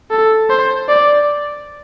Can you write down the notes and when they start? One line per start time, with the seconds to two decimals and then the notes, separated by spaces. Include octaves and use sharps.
0.11 A4
0.50 C5
0.89 D5